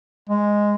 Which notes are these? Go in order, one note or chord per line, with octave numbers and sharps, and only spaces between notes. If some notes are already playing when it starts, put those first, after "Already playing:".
G#3